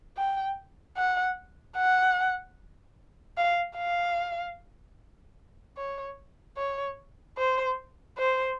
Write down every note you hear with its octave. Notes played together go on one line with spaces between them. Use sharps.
G5
F#5
F#5
F5
F5
C#5
C#5
C5
C5